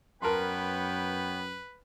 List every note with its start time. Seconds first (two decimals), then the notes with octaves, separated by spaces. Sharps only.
0.22 F#2 B3 A#4 B4 C#5 G5 A5 C6